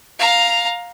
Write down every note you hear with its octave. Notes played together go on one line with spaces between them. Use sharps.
F5 A#5